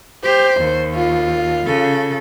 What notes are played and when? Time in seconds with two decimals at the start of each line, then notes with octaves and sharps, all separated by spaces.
0.24 G4 C5
0.60 D#2
0.95 F4
1.65 C#3 A4